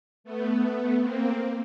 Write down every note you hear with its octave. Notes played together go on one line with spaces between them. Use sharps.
A3 B3
A#3 C4